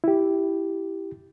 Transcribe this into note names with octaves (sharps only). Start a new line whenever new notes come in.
E4 G4